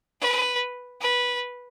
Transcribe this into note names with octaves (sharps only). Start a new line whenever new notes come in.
B4
B4